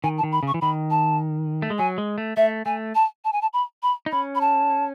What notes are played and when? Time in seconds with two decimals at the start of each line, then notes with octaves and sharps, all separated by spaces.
0.04 D#3 G#5
0.18 A5
0.23 D#3
0.32 B5
0.43 C#3 C#6
0.54 E3
0.61 D#3 B5
0.90 A5
1.62 A3
1.70 G#3
1.78 F#3 G#5
1.98 G#3
2.18 A3
2.37 A3 E5
2.65 A3 G#5
2.95 A5
3.25 A5
3.33 G#5
3.42 A5
3.53 B5
3.83 B5
4.06 D#4
4.12 C#4 B5
4.35 B5
4.41 A5